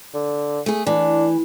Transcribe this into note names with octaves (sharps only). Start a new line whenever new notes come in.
D3
A3 G#4
E3 D4